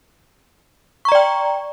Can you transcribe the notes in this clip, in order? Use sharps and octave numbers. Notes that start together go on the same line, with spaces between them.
D5 G5 A#5 C#6